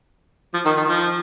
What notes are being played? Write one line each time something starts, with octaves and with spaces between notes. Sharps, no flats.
F3
D#3
D#3
F3